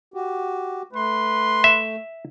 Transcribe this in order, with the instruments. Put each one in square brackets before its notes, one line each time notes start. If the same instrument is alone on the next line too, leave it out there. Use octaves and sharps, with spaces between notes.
[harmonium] F#4 G4
[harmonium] A3 [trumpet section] B4 C6
[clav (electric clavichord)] E5